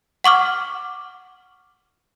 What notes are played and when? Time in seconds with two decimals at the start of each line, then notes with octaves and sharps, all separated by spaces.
0.24 F#5 C#6 D6 F6